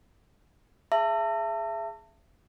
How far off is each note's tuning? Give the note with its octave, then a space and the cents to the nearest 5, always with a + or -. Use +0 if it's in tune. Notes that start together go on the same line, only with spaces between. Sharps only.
G#4 +0 E5 +30 A5 +30